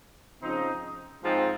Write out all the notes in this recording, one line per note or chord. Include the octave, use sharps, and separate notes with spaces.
C#3 F3 C4 D#4
G#2 F3 C4